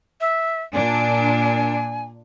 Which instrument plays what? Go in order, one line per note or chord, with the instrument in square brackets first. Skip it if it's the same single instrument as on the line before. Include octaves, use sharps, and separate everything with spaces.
[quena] E5
[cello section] A#2 D4 [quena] G#5